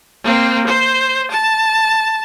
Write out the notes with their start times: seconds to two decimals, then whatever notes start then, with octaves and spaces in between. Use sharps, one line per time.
0.24 A#3 C4
0.66 C5
1.31 A5